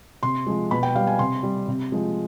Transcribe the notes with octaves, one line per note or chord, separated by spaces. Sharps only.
C3 C6
F3 G#3
B2 B5
G5
G3 F5
G#5
C3 C6
G3
C3
F3 G#3